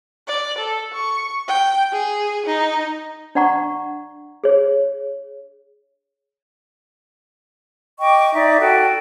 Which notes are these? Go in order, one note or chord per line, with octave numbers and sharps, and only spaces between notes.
D5
A4
C#6
G5
G#4
D#4
D4 D5 F#5 A#5 C#6
G#4 C#5
D#5 G5 C#6 D6
D#4 D5 E5 D6
F#4 A4 G5